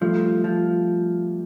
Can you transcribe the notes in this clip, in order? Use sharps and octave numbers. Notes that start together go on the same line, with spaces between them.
F3 G3 A3
F3